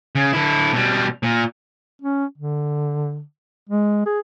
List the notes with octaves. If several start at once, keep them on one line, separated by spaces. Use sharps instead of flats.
C#3
D3 E4
B2 G3
A#2
C#4
D3
G#3
G#4